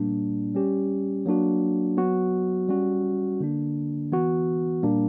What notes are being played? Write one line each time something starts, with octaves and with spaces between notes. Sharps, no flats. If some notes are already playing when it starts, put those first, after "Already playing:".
Already playing: A#2 G3 A#3 D4
G3 C#4 G4
F#3 A#3 D4 F#4
F#3 B3 F#4
G3 C#4 F#4
D3 A#3 D4
E3 B3 F#4
A#2 G3 A#3 D4